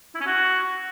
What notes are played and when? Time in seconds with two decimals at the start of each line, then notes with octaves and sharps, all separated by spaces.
0.15 E4
0.20 C#4
0.26 F#4